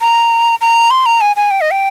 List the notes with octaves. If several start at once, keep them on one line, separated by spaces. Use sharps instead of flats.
A#5
A#5
C6
A#5
G#5
G#5
G5
D#5
G5